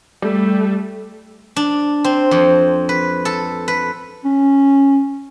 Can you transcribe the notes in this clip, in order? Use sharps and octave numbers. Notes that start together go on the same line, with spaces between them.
G3 A3
D4
C4
F2
B4
A4
B4
C#4